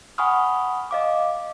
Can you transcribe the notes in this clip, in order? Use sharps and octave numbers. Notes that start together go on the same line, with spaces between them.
F#5 G#5 B5 C#6 D#6 F6
D#5 F5 D6